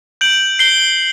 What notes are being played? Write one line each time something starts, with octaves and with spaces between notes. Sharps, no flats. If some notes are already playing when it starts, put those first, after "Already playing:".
G6 D7 F#7
G6 C7 G7